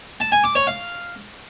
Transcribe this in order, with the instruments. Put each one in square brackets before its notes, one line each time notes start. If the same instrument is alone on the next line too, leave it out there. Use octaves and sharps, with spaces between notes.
[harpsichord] A5
G#5
D6
C#5
F5